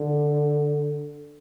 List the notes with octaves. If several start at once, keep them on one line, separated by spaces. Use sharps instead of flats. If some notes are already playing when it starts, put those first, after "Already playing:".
Already playing: D3